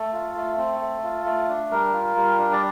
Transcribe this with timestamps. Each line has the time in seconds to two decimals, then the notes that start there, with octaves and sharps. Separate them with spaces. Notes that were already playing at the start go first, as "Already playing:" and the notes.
Already playing: A3 A4
0.13 F4
0.36 A3
0.58 C4
0.81 A3
1.03 F4
1.25 A3
1.48 D4
1.71 G3 A#4
1.93 F4
2.16 G3
2.38 D4
2.53 D5